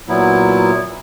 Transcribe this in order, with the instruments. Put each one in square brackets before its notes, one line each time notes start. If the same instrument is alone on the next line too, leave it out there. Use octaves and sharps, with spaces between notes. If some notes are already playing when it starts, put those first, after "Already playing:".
[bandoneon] A#2 F#3 B3 E4